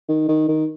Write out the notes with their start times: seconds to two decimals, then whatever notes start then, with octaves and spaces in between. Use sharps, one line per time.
0.08 D#3
0.28 D#3
0.49 D#3